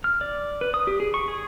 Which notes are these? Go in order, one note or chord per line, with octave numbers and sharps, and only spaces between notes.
F6
D5
B4
D#6
G4
G#4
C#6
G#4